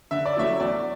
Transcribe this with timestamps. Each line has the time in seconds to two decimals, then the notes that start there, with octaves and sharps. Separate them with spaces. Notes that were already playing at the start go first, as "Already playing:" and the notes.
0.11 D3 E5
0.25 D5
0.36 F#3 A3 C#4 E4 E5
0.60 E2 D5